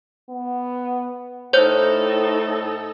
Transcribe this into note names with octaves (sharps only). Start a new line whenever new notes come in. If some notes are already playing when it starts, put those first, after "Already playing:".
B3
A2 D#4 A4 C5 C#5 G6